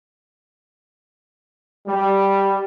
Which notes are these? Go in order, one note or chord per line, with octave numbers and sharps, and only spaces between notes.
G3